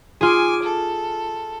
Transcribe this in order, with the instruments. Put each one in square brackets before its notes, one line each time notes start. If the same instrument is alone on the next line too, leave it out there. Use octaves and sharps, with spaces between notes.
[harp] F4 G#4 [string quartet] G#5 D6
[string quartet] A4